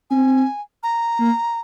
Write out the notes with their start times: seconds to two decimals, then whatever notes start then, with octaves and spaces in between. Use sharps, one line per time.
0.10 C4 G#5
0.83 A#5
1.19 A#3